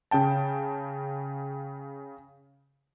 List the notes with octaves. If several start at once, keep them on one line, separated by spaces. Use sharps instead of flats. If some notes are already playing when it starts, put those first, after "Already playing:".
C#3 C#4 G5 A5